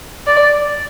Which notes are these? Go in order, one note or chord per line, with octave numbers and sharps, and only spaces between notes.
D5